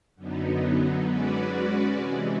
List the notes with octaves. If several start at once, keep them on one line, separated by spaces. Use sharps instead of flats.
F#2 D3 F#3 B3 D#4
G#3 C#4 F#4 B4 D5
C3 E3 G#3